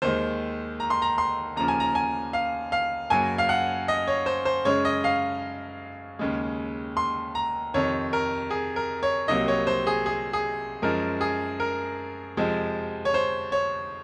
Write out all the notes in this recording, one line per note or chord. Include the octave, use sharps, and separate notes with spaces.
D#2 D#3 G#3 C5
A#5
C6
A#5
C6
D#2 C#3 F3 A#5
G#5
A#5
G#5
F5
F5
F#2 C#3 F#3 A#3 G#5
F5
F#5
D#5
C#5
C5
C5
F#2 C#3 G#3 C#5
D#5
F5
D#2 C#3 G#3
C6
A#5
F2 C3 D#3 C#5
A#4
G#4
A#4
C#5
C2 C3 F#3 A#3 D#5
C#5
C5
G#4
G#4
G#4
F#2 F3 G#3 A#4
G#4
A#4
F2 C3 F3 G#3
C#5
C5
C#5